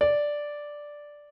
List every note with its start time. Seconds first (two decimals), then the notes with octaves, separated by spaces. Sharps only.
0.01 D5